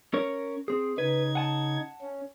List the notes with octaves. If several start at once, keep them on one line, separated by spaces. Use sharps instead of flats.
C#4 A#4 C#5
C4 G#4
C#3 D#4 B4 G#6
F#5 G#5 A5
C#4